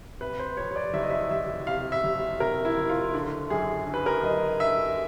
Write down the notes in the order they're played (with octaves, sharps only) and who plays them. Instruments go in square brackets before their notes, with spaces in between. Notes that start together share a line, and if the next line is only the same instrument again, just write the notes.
[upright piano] C3 B4
C5
F2 C#5
C#5
D5
F#1 E5
D#5
E5
F#1 E5
C3 F5
E5
F#1
C3 A#4
E4
F#1
F4
D3
F#2 G#4
D3
B4
A#4
F#2 D#5
D3 E5